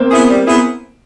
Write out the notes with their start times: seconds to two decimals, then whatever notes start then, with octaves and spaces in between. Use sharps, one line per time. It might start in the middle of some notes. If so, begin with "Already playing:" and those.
Already playing: A#3 C4
0.11 B3 E4 G#4
0.29 G3
0.46 B3 E4 G#4